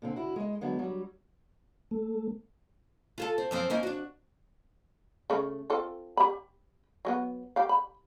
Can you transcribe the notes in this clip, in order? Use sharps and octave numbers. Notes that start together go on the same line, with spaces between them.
A#2 D3 C4
D2 E4 F#4
G#3 D#5
D3 F#3 G#3 B3
F#3 G3
A3
F4 G#4 A4
C4
F#2 F3 C4
A#3 C#4 D#4
D4 F#4
C#3 A3
C4 F4 A4
G4 B5
F#3 A3 B3
G4 F5
B5